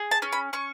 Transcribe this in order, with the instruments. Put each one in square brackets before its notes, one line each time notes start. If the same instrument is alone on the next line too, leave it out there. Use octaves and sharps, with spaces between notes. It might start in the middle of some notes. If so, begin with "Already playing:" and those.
Already playing: [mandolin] G#4
A5
C#4
B5
C#4 C#6